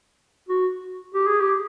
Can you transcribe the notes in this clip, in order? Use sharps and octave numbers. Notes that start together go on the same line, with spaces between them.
F#4
G4
G#4
G4